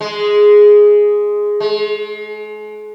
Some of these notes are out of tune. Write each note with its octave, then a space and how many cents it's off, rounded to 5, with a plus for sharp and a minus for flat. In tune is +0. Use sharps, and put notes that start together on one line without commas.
G#3 +0
G#3 +40